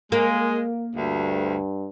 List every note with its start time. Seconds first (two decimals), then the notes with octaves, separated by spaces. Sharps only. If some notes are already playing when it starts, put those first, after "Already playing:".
0.12 G#3 A#3
0.96 D2 G2